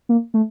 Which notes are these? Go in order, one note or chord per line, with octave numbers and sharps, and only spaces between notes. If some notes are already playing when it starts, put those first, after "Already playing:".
A#3
A3